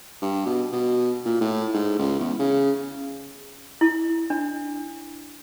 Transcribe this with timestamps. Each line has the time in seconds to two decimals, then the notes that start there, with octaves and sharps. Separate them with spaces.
0.22 G2
0.46 B2
0.72 B2
1.25 A#2
1.41 A2
1.74 G#2
1.99 C#2
2.20 E2
2.40 C#3
3.81 E4
4.30 D4